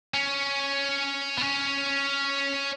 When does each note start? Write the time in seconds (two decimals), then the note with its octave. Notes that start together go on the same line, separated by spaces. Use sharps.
0.14 C#4
1.38 B3
1.41 C#4